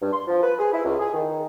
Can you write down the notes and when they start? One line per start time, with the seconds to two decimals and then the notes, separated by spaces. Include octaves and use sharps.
0.01 G2
0.13 C6
0.27 F3
0.43 B4
0.59 G#4
0.73 E4
0.85 C#2
1.00 G#4
1.13 D#3